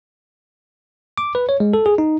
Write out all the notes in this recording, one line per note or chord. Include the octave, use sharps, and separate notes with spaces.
D6
B4
C#5
G#3
A4
G#4
D#4